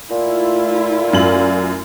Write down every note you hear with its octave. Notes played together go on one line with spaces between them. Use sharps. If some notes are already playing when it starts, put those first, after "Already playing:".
A#2 A3 E4 F4
F#2 F#7